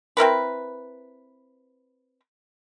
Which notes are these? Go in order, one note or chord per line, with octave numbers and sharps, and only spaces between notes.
C4 E4 A#4 B4